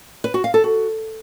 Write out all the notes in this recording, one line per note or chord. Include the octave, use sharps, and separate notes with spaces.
B4
F#4
F5
A4
F#4